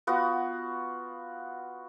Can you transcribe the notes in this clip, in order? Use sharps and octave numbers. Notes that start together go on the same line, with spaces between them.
B3 F4 F#4 D#6